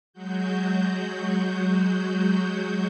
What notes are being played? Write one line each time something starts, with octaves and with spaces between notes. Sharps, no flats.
F#3 G#3 F#4 G6